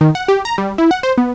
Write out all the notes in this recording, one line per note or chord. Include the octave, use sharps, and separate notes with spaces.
D#3
F#5
G4
A#5
G3
E4
F#5
C5
B3